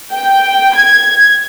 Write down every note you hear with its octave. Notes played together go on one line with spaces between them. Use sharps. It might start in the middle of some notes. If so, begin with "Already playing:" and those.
G5
G#6